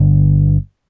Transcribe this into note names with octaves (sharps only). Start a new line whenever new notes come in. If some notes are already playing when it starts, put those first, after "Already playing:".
Already playing: G1 G2 D3